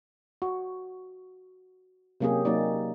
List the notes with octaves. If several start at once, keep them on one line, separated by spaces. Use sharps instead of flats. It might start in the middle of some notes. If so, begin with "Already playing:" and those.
F#4
C3 F#3 A#3 C#4 G4 G#4
F#3 A#3 D#4 D5